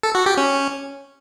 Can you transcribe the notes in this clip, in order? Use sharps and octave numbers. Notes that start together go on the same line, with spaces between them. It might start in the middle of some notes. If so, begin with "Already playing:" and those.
A4
F#4
G4
C#4